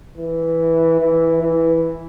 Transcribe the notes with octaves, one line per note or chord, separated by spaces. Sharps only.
E3
E3
E3